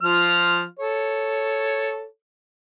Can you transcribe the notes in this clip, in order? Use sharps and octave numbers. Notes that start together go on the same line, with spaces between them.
F3 F4 F6
A4 C#5